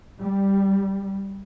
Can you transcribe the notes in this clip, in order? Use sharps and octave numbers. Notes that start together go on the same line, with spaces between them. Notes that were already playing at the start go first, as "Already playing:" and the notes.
G3